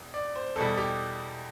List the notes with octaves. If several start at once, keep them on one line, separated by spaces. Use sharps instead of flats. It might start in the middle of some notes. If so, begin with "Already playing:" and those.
Already playing: E1 E2
D5
C5
E2 B2 G3 A4
G4